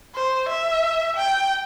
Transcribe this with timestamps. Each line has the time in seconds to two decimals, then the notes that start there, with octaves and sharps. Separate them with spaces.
0.15 C5
0.49 E5
1.17 G5